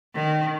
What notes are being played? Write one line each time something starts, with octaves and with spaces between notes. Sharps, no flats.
D#3